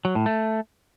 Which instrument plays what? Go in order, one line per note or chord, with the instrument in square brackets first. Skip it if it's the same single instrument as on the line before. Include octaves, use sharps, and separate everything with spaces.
[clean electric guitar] F#3
A2
A3